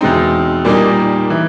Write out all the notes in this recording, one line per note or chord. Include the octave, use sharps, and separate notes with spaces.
E2 B2 G#3 C4 D#4
A#2 G3 A#3 D#4
E3